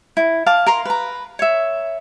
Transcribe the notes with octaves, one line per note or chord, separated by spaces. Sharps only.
E4
F5 A5 D6
A#4 A#5 C6
B4 A#5
C#5 E5